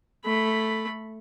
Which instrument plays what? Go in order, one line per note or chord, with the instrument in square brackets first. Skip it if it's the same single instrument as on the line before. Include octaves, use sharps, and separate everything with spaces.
[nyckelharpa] A3 B5